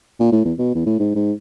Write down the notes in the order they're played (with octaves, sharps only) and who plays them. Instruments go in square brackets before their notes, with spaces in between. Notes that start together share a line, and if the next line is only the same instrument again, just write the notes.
[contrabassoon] A#2
A2
E2
B2
E2
A2
G#2
G#2